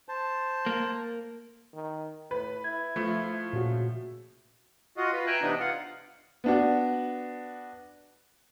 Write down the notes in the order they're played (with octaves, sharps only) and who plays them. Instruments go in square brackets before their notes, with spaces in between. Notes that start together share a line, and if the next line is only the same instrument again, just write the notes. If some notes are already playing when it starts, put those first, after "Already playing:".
[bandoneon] C5 A5
[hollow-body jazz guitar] A#3
[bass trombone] D#3
[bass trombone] A2 [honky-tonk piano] B4
[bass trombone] E4 [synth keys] G#6
[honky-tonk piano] F3 A3
[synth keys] A#2 F#4 [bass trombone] C#3
[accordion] F4 F#4 D#5
F4 B4
E5 G5 G#5 A#5 F#6
C3 E3 B3 D4 D#4
F4 F#5
[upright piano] B3 D4 F#4